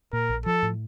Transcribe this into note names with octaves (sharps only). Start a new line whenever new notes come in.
A#2 A#4
A#1
F3 A4
A2